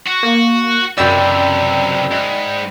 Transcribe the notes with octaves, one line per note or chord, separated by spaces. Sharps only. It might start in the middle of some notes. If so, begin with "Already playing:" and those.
F#4
A#3
C#2 F#2 C3 D5 G5 B5 E6
G#2